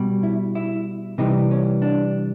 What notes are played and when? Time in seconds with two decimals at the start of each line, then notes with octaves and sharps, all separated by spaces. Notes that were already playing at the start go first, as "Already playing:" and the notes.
Already playing: B2 G3
0.23 E4
0.55 E4
1.18 C3 E3 G3 D#4
1.51 C#4
1.82 D4